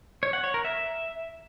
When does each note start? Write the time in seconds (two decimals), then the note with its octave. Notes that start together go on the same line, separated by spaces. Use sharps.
0.23 C#5
0.33 F#5
0.44 C#5
0.54 A#4
0.65 E5